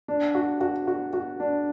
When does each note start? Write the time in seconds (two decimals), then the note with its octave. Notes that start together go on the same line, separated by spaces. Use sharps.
0.08 D4
0.35 F#4
0.61 F#4
0.87 F#4
1.13 F#4
1.40 D4